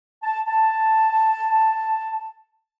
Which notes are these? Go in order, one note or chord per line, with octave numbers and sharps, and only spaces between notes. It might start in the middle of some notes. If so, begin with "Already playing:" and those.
A5
A5